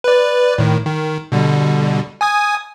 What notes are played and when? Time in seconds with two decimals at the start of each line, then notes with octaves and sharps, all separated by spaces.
0.04 B4 D5
0.58 A2 D#3
0.85 D#3
1.32 B2 D3 G3
2.21 G#5 D#6 G#6